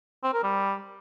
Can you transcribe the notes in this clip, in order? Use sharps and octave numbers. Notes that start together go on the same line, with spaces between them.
C4
A#4
G3